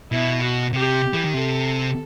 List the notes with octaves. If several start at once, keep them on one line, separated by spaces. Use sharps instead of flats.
B2 E4
F#4
C3 G4
E3
D#3
C3 A4